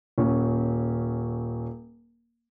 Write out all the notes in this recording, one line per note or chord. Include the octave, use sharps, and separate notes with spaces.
D#1 C#4